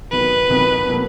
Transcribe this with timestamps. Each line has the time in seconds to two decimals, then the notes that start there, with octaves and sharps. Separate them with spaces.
0.12 F2 D#3 F#3 B3 B4
0.50 F2 D#3 F#3 B3
0.88 B2 F#3 A#3